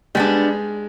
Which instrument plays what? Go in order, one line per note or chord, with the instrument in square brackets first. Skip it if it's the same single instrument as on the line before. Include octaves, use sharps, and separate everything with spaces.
[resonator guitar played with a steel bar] G3 B3 D4 [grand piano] G#3